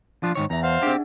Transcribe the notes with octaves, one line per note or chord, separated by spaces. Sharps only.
F3 D4 F4
G#2 D#3 C#5
E2 E4 E5 A#5
C5 F5 F#5
C4 D4 D#4 G4 G#4